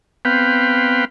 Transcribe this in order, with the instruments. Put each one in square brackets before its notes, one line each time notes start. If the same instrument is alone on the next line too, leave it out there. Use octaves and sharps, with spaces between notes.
[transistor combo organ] B3 C4 B4 F5 G5